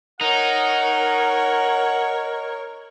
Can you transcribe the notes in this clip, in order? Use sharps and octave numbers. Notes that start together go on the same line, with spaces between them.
D#4 A#4 C#5 F#5